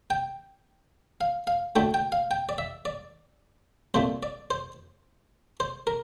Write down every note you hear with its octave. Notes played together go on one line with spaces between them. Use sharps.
G5
F5
F5
D2 D3 A3 G5
G5
F5
G5
D5
E5
D5
C2 A#2 F3 A3 C5
D5
C5
C5
A#4